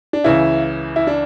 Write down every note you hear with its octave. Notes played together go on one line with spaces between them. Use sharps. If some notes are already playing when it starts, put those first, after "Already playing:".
D4
C#2 C#3 E3 E4
E4
D4